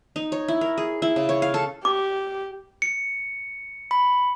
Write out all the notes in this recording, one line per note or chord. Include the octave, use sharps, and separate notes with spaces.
D#4
C#5
E4
A#4
G#4
E4
C#3
C#5
F5
A4
G4 D6
C#7
B5